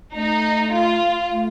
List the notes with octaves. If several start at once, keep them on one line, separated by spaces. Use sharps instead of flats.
A3 D#4
F4
A3